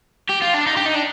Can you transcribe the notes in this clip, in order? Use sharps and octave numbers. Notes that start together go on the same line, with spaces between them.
G4
F4
D4
D#4
G4
D#4
D4